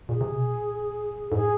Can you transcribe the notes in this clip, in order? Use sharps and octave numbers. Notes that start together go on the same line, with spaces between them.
A#2 G#4
C3
B2
A#2
G#2 A4
A2 G#4